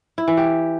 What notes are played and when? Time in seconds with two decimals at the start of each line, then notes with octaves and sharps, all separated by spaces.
0.18 E4
0.28 E3
0.37 G4